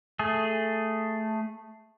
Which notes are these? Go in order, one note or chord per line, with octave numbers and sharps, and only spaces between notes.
A3 G#4